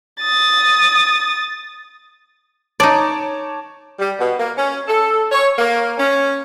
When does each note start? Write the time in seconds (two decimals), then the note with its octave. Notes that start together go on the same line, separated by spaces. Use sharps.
0.21 D#6 A6
2.80 D#4 C#5 D5 A5 D6
3.99 G3
4.19 B2
4.38 A#3
4.57 C#4
4.88 A4
5.32 C#5
5.57 A#3
5.98 C#4